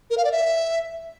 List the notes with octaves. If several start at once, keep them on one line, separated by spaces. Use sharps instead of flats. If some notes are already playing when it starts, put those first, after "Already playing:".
A#4
F5
D5
E5